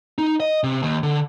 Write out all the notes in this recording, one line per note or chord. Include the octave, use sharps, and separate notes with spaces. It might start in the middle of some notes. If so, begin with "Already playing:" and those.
D#4
D#5
C3
D#2
D3